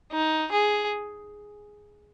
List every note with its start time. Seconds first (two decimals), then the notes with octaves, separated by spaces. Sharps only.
0.12 D#4
0.52 G#4